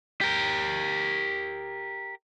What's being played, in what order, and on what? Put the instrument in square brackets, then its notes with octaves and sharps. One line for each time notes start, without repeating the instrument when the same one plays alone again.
[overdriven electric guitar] G4 A#4